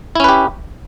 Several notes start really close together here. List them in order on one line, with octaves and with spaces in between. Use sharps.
E4 C#4 B4 G4